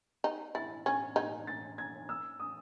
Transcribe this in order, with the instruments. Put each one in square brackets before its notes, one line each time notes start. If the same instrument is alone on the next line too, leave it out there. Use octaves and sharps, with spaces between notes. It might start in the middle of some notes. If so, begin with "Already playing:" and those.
[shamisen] D#4
[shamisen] E4 [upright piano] A6
[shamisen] C#4 [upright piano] G#6
[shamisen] D#4 [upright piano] G#6
[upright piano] A6
G#6
E6
D#6